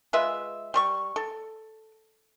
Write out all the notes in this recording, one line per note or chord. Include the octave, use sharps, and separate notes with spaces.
G#3 F4 B4 E5
G3 C6 C#6
A4